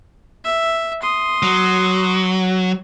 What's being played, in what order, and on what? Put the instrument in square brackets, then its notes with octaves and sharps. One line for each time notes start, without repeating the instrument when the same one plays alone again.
[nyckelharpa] E5
C6 D#6
[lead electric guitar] F#3